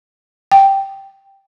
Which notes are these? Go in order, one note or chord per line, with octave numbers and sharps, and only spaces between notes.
G5